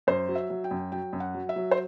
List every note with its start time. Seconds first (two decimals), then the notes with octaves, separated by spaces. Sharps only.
0.07 F#2 C5
0.29 F#3
0.35 E5
0.50 F#3
0.64 G5
0.71 F#2
0.92 F#3 G5
1.13 F#2
1.20 F#5
1.34 F#3
1.49 E5
1.56 F#3
1.71 C5